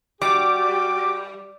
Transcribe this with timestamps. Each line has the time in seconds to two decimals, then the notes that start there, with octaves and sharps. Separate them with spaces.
0.22 G3 F#4 G4 D6